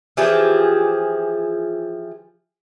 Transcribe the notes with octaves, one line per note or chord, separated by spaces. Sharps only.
E3 F3 G4 G#4